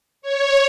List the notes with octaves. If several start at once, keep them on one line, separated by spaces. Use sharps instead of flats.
C#5